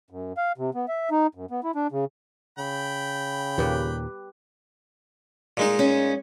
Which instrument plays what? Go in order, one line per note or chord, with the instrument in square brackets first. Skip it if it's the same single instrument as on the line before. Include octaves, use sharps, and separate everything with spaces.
[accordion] F#2
F5
C3
B3
E5
D#4
F#2
B3
E4
D4
C#3
[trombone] C#3 [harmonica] G5 B5
[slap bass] D#2 A#2 [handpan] G4 B4
[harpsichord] A#2 G#3 D#4
[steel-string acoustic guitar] C#4